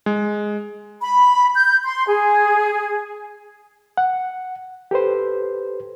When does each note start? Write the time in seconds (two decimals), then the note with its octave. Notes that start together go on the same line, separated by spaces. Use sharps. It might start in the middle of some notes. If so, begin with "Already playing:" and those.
0.06 G#3
1.02 B5
1.55 G6
1.84 C6
2.07 G#4
3.97 F#5
4.91 G4 A4 B4 C5